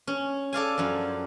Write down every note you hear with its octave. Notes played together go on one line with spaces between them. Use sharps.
C#4
A4 D5 F5 G#5
F#2 F3